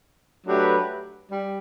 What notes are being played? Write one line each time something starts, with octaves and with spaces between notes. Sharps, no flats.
F#3 A3 D4 G4 B4
G3